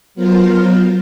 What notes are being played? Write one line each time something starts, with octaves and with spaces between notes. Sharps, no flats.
F#3 B3 F4 A#4 C5